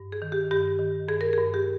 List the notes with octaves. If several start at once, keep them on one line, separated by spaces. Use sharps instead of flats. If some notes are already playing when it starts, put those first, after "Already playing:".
Already playing: G2
G#4
D#3
G4
G2 G4
D#3
G2 G#4
A#4
G2 G#4
G4